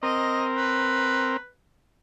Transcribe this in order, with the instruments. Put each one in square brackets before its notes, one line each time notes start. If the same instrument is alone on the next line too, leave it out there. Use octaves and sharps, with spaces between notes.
[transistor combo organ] C4 A#4 [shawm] D#5
[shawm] B4